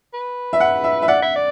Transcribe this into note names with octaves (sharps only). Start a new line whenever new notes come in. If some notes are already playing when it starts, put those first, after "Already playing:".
B4
E5
F#5
E5
E5
D5 F#5
E5
D5